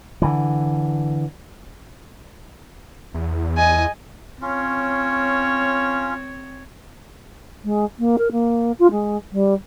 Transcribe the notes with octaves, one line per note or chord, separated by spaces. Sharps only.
D3 E3
E2
D#5 G#5
C4 C#4 F4 C#5
G#3
A#3
A#4
A#3
F4
G#3
G3